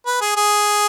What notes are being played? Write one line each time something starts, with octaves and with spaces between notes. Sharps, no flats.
B4
G#4
G#4